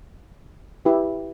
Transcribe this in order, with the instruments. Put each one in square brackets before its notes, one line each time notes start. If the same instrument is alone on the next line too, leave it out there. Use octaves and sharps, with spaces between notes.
[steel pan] E4 G4 B4